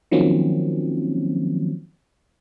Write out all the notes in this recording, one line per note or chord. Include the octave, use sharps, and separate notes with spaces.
D#3 F3 F#3 A#3 C4 C#4